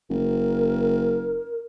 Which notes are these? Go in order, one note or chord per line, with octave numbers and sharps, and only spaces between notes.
F#1 A#4